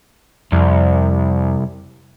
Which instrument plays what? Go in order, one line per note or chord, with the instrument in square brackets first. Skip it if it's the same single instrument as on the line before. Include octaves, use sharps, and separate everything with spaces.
[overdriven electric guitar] C2 [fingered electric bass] F2